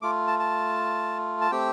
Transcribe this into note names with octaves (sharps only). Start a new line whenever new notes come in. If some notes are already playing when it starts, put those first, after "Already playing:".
A3 F4 D6
A5
A5
A5
A3 C4 G4 G5